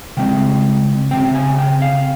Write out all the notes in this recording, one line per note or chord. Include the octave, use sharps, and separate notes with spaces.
C#3 G#3 C4 G5
C#3 G#3 C4 G5
G#5
G5
F5